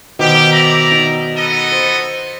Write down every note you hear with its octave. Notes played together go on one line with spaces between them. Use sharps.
B2 D#3 G4 C5
D5 E5 A#5
D#4 G#5
B3 A4 D#5
C5